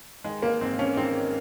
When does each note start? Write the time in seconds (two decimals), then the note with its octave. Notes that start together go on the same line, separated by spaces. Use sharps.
0.24 D#3 G#3
0.42 G#1 A#3
0.61 G#2 C4
0.79 G#1 C#4
0.97 D#3 C4